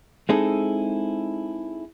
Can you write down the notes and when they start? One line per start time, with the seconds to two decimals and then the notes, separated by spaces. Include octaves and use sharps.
0.29 G#3 C4 D#4 E4 G#4 A4